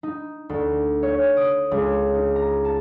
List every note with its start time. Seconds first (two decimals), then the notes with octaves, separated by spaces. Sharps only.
0.03 D#4
0.49 D2
1.03 C#5
1.37 D#6
1.71 C#2
2.15 D#4
2.36 A#5
2.65 A5